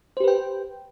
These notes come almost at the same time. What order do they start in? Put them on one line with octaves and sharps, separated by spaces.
C5 G4 B4 G5